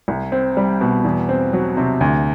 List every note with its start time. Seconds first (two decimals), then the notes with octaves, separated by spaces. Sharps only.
0.08 C2
0.32 C4
0.57 G3
0.81 B2
1.04 E2
1.29 C4
1.53 F#3
1.77 C3
2.01 D2